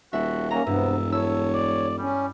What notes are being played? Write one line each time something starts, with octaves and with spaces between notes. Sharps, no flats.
D#1 F#4 E5
F#3 A#3 C#4 A#5
E1 G2 C3 B3 E5
E4 A4 C#5 E6
D5
G3 C#4